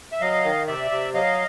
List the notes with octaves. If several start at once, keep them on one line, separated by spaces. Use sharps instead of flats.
E5
F#3 D#5 F5
D#3
C3 D5 E5
C3
F#3 D#5 F5